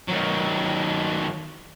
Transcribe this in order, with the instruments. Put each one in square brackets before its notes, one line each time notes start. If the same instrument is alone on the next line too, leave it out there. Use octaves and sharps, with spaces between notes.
[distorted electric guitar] D#3 F#3